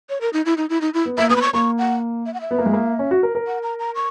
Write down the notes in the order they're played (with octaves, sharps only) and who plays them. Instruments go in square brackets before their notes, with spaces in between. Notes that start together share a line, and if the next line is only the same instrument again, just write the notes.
[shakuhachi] C#5
A#4
D#4
E4
D#4
E4
D#4
E4
[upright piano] B3
[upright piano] A#3 [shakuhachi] E5
[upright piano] B3 [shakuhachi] D#6
[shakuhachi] B5
C#6
[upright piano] A#3 [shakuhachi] C#6
[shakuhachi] F#5
E5
F#5
E5
[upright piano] B3
A#3
G#3
A#3
C#4
F#4
A#4
A#4
[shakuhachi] F#5
A#5
A#5
C#6